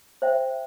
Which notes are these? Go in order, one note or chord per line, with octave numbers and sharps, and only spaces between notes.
C5 E5 G5